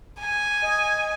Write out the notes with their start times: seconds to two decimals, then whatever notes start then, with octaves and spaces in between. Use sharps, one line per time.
0.20 G#5
0.62 D#5